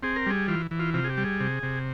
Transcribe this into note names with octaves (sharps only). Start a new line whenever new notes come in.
C4 G#4
A#4
G3 G#4
E3 F4
E3
F4
C3 F4
G#4
G4
G3
G#4
C3
C3